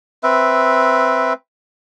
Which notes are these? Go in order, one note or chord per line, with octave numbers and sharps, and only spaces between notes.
C4 B4 E5